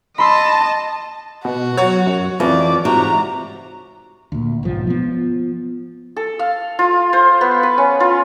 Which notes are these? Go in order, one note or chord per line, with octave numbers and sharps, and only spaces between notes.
D#5 A5 B5 C6 E6
B2 F#4
F#3 C#5
F#2
F2 E3 D5
G#2 C3 F#4 A#5
D2 A#2
B1 G#2 F3
F3 B3
A4
F5
F4
C5
B3
B4
C#4
F4